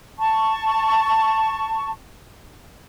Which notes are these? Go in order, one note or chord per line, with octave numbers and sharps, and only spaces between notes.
A5 C#6